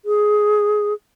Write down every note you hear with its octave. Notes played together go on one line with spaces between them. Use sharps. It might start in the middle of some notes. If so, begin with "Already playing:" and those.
G#4